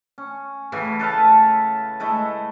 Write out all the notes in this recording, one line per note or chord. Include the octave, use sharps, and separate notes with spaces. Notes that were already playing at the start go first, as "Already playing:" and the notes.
C#4
A2 C#3 E3
A4 B4 F5 A5
G#3 A3 E4